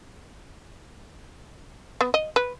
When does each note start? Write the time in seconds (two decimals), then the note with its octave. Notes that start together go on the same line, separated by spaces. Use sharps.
2.01 B3
2.14 D#5
2.36 B4